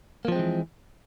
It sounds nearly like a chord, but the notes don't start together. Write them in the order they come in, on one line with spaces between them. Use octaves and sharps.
A#3 F3 C4 G#3 E3